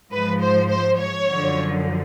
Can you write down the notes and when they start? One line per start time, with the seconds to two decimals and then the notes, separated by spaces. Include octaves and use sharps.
0.12 G#2 F3 B4
0.41 C5
0.70 C5
0.99 C#5
1.29 F#2 D3 F3